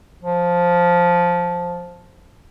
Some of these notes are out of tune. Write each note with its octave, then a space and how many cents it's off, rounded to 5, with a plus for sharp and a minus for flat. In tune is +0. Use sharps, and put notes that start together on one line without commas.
F3 +5